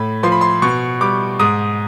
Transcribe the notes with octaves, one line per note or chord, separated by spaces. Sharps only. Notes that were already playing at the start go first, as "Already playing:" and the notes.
Already playing: A2 B5
F3 C6
B5
C6
B2 C#6
G3 D6
G#2 D#6